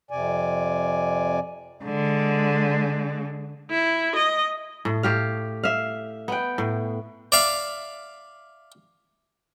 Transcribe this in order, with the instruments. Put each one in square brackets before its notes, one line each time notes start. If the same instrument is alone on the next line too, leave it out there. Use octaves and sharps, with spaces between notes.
[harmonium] F2 C3 D5 G#5
[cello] D3 G#3
[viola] E4
D#5
[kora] A2
A2 G4 F5
E5 F5
B3 G5
A2
[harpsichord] D5 E5 F5